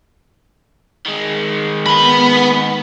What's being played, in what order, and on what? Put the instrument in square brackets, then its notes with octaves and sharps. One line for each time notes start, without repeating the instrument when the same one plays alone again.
[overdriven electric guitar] D#3 G#3
[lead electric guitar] B3 B5